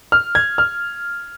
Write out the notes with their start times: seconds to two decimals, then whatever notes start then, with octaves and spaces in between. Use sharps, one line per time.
0.12 F6
0.35 G#6
0.58 F6